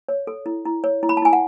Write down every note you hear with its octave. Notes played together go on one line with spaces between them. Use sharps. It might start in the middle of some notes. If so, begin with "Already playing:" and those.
C#5
A4
E4
E4
C#5
E4
B5
A5
E4 G#5
F#5